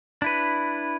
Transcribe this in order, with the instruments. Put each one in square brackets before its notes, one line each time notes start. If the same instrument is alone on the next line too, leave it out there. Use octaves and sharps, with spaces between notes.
[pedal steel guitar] D4 E4 B4